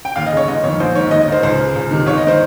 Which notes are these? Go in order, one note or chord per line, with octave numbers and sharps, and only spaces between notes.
G5
D#2 F5
D#5
C#3
C#5
G1 D#5
F2 D#3 C#5
A#1 C5
G#2 D#3 C#5
D#2 D#5
D#5
D#3 C5
C#2 C5
C#3
C#2
C3 D#3
G1 C#5
D#5
D#3 C5